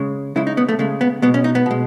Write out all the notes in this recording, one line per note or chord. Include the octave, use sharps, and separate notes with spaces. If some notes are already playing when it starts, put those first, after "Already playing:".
Already playing: C#3 G#3
C#3 G#3 E4
D#4
B3
A3
C#3 G#3 A3
B3
B2 G#3 B3
C#4
D#4
B3
B2 G#3